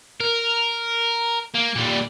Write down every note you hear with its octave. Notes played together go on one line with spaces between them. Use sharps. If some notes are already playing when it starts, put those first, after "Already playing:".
A#4
A#3
A#2 G3